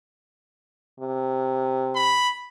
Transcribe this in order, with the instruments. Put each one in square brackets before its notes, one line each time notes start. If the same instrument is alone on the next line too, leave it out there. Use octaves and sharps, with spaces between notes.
[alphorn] C3
[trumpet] B5